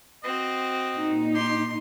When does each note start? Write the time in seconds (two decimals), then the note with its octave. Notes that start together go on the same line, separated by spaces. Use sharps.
0.24 C4 F#4 D#5
0.96 A#2 D#4
1.35 G4 C6